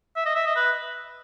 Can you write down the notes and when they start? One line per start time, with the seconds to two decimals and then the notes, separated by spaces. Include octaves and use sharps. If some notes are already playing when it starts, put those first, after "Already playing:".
0.16 E5
0.26 D#5
0.35 E5
0.46 D#5
0.56 B4